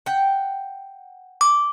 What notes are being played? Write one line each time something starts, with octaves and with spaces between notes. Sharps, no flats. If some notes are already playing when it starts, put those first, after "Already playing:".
F#5 G5
D6